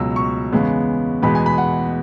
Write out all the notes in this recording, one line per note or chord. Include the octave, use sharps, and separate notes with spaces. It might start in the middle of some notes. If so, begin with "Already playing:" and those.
Already playing: C#2 B2 F#3 E6
C#6
E2 C#3 G#3 B3
E2 B2 G#3 B3 B5
G#5
B5
F#5